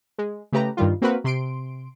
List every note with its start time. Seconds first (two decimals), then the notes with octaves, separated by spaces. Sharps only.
0.18 G#3
0.52 C#3 A3 G4 B4 A#5
0.77 G2 D#3 G3 F4
1.02 A#3 C4 F#4 A#4 B4
1.24 C3 C6 D7